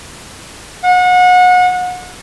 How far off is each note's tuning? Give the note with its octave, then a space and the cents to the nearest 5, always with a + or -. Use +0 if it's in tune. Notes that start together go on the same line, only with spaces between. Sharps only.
F#5 -30